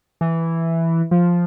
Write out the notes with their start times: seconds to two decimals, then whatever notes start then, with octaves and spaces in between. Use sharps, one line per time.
0.21 E3
1.11 F3